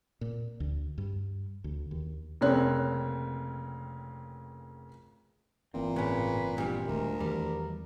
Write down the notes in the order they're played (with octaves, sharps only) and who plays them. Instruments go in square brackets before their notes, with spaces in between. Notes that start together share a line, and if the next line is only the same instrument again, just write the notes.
[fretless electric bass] A#2
D2
G2
D2
D#2
[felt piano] F1 C#3 A#3 C4 C#5 F#6
[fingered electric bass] G1 E3 C4 [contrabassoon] A#2
[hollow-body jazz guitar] A2 C#3 [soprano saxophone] B4
[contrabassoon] A#1 [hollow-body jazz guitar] A#2 G3
[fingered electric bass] E1 D#3 G#3 [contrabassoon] D2 [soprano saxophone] A#4
[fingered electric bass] E2 D#3 E3 [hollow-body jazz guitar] G3